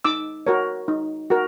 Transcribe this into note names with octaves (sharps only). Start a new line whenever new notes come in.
D#4 D6 E6
F#4 A#4 C#5
D#4
F#4 A#4